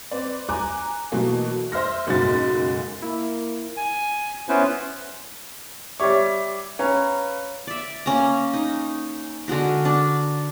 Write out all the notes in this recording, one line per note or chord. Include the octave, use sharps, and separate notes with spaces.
C4 B4 D5
G#5 A#5 D6 F#6
B2 E3 F#3 A3 A#3
C5 E5 C6 F6 A#6
F#1 B1 G#2 A#3 F#4 A6
A#3 E4
G#5
B3 C#4 E4 B4 C5
G3 G4 C#5 E5 D6
C#4 B4 F5 A#5
D5 E5
A#3 C#4 A#5
D#4
D3 G#3 F#4 A#4
D4